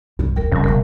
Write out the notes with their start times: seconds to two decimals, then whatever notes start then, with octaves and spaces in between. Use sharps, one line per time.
0.19 C2 G2 A#2
0.36 D#1 G2 A#4 G5
0.52 F2 C#3 F3 G3
0.64 F#1 F#2 B2 A#4